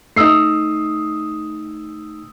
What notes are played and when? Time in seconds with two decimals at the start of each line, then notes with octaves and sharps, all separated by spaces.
0.16 A3 D#4 D#6 E6 C7